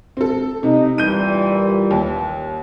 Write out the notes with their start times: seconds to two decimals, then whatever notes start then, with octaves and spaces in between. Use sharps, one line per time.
0.17 C4 A4
0.63 C3 D#4
0.98 A#2 E3 G3 G6 D#7
1.91 D#2